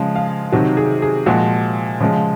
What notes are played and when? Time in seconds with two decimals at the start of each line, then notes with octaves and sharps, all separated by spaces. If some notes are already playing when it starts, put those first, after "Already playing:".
Already playing: C#3 F3 G#3
0.16 F5
0.52 C3 D#3 F#3 F#4
0.77 G#4
1.02 G#4
1.26 A#2 F3 G#3 F#4
2.00 C#3 F3 G#3